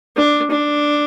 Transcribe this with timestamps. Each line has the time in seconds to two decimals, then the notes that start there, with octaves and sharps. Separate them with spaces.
0.16 D4
0.51 D4